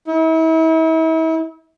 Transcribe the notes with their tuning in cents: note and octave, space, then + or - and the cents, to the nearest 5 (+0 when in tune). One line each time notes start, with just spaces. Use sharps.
E4 -40